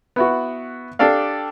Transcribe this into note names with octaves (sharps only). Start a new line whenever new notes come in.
B3 E4 F#4
D4 G4 A4 D5 F5